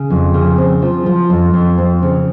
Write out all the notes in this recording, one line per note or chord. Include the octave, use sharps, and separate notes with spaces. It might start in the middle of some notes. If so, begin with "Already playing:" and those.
Already playing: C#3
F2
C#3
C4
F3
F3
F2
F2
C4
C#3